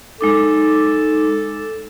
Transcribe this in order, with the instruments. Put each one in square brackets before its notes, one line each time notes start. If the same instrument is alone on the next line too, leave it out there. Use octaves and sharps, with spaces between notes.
[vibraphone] G#3 D#4 D6 [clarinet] A4